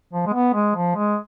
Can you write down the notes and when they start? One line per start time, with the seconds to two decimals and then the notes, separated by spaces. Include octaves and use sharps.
0.13 F3
0.26 G#3
0.33 B3
0.54 G#3
0.75 F3
0.95 G#3